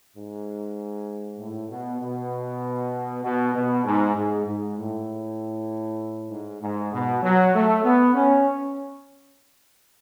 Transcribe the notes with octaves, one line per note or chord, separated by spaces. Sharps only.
G#2
A2
B2
B2
B2
B2
G#2
G#2
G#2
A2
G#2
G#2
B2
F#3
A3
B3
C#4